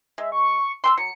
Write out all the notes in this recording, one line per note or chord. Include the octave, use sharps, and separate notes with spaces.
G#3 E5
C#6
D4 G5 C6 E6
F#3 C#7